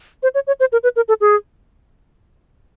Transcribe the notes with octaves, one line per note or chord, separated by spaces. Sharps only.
C5
C#5
C#5
C5
A#4
B4
A#4
A4
G#4